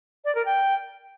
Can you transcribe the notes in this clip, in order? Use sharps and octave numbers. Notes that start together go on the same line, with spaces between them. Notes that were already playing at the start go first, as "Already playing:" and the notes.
D5
A#4
G5